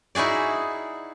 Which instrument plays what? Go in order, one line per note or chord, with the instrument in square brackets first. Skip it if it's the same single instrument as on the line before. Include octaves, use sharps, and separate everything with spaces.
[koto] D#4 E4 F#4 G#4 D5